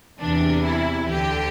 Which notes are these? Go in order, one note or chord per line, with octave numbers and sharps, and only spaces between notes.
E2 C3 E3 D4
E4
D2 D3 G4